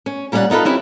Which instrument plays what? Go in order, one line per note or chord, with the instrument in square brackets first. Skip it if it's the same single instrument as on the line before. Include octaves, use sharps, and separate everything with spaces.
[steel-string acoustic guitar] C#4
A#2 G3 C#4 A4 D5 F#5
B3 D#4 F4 A4 B4
C4 C#4 E4 G4